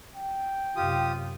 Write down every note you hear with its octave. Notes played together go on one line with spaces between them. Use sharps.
G5
F#2 C3 F4 G4 D#6